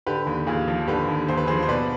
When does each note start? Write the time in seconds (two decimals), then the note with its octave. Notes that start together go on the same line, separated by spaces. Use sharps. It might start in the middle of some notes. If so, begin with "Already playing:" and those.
0.07 D3 G4 B4
0.26 D#2
0.47 D#2 F4 G#4
0.68 F3
0.87 D3 G4 B4
1.08 D#2
1.29 D#2 C5
1.37 B4
1.47 F3 G#4 C5
1.63 C5
1.69 B2 B4 D5